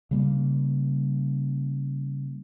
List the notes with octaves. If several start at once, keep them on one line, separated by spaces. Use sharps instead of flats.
C#3 G3 A#3